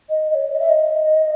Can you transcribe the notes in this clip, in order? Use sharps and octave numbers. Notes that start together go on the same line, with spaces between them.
D#5
D#5
C#5
D#5
E5
D#5